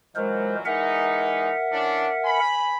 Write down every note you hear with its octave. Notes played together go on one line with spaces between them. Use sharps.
A#2 E3 F#3 G#3 A#4 C5
E3 G#3 D#4 A#4 E5 F#5
E3 C#4 D4
B4 G#5 B5